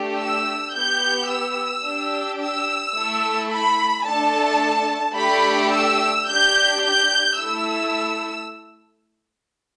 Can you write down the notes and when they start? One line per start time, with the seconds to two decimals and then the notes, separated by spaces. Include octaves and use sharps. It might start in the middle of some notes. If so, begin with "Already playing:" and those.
Already playing: A3 D4 G4
0.19 E6
0.75 B3 G4 G6
1.30 E6
1.86 D4 G4
2.41 E6
2.96 A3 E4 A4
3.52 B5
4.07 A3 D4 A4 A5
5.18 A3 D4 G4 B5
5.74 E6
6.28 D4 G4 G6
6.85 G6
7.39 A3 E4 A4 E6